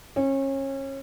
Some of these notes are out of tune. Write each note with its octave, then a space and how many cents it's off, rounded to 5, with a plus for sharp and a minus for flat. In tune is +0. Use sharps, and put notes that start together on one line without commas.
C#4 -30